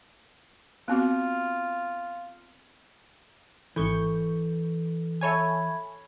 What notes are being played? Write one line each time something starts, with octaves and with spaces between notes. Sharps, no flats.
B3 C4 F4 F#4
G#1 E3 A4 C#6 G6
A4 C#5 E5 G#5 B5 G#6